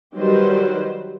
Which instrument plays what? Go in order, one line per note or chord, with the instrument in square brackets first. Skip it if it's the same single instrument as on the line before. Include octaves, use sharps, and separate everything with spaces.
[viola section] D#3 F#3 G3 G4 B4 C5